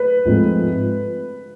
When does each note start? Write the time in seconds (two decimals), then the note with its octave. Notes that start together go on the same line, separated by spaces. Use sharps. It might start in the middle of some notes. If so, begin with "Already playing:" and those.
Already playing: B4
0.25 G#2 F3 A3 C4